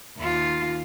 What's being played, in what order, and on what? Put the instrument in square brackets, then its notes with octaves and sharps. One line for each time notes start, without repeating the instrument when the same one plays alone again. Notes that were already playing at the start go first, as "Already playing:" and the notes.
[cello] D#2 F4